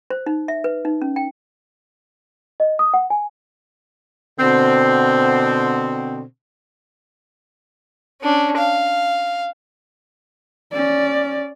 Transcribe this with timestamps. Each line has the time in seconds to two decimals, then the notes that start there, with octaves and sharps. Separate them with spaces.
0.10 C5
0.26 D#4
0.48 E5
0.64 B4
0.85 D#4
1.02 C#4
1.16 G5
2.60 D#5
2.79 D#6
2.94 F#5
3.10 G#5
4.40 B2 D3 C4
8.22 C#4 D4
8.58 F5
10.73 C#4 D5